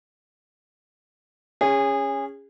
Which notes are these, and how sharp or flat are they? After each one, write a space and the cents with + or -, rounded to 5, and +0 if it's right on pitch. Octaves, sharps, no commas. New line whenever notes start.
C#4 +0 G#4 -25